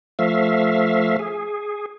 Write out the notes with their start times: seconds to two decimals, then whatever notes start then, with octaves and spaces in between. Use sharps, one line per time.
0.19 F3 A3 E5 F5
1.19 G#4